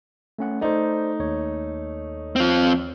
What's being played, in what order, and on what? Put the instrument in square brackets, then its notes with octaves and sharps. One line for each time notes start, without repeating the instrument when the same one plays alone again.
[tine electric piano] A3 C#4 F#5
[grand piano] A3 D#4 [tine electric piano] C5 D5
[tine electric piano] D#2 C#5
[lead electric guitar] F3 C4